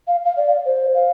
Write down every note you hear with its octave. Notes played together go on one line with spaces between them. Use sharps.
F5
F5
D5
C5
F5